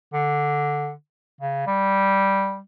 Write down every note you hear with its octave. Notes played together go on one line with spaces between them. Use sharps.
D3
C#3
G3